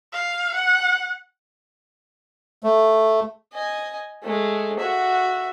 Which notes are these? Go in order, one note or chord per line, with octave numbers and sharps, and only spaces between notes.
F5
F#5
A3
D#5 G#5
G#3 A3
F#4 E5